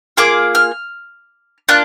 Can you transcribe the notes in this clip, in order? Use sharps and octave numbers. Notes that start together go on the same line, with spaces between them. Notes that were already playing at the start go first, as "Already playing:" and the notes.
A#3 F4 G#4 D6
F6
A#3 D4 F4 F#6